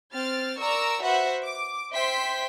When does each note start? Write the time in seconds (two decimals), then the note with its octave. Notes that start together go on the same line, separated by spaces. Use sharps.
0.13 C4 F6 A6
0.60 A#4 D5 A#5 C#6 E6
1.03 F#4 B4 C5 E5 F#5
1.45 D6
1.93 C5 E5 G5 C6 B6